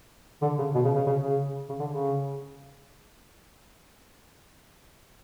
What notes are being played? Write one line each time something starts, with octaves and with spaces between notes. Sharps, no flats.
D3
C#3
B2
C#3
C#3
C#3
C#3
C#3
D3
C#3